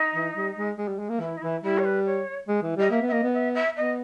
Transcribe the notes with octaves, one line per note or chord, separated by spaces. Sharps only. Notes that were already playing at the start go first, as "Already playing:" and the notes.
Already playing: D#4
E3
G3
G#3
G#3
G3
G#3
A#3
E3 E4
D#4
E3 E4
G3 E4
C#5
B4
C#5
G#3
E3
G3 D#5
A#3 E5
B3
E5
A#3 D#5
B3
E5
E5
B3 D#5